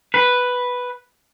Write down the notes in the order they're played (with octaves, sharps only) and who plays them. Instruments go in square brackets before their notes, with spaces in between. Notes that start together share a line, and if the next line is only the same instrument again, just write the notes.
[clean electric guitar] B4